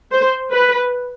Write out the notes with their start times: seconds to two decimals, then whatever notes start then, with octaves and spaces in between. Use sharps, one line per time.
0.13 C5
0.52 B4